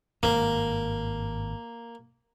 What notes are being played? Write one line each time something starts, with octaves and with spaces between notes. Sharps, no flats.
G#1 G2 A#3